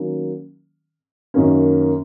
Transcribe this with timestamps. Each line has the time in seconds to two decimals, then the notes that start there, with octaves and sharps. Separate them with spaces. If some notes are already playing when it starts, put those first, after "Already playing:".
Already playing: D#3 F#3 A#3 C#4
1.34 F#2 D#3 A#3 C#4